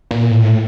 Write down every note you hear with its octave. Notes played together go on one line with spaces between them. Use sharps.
A#2
A2